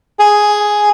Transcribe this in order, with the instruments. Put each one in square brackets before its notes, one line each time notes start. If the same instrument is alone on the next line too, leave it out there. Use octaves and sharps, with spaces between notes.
[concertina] G#4